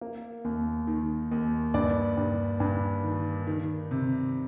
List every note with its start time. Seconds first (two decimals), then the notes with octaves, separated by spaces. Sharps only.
0.01 A#3
0.45 D#2
0.87 D#3
1.31 D#2
1.74 G2 D5
2.17 G2
2.60 G2
3.04 D#3
3.47 D#3
3.91 C3